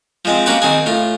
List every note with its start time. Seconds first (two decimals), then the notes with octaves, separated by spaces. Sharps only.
0.25 F3 G#3 C4
0.46 A#3 C#4 F#4 G4 B4
0.62 D#3 C4 G#4
0.86 A2 F4